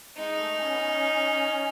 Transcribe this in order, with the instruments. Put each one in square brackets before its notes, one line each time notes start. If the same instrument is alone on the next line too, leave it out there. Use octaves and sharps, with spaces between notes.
[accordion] G#3 [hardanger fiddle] D#4
[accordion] A3
C#4
B3
C#4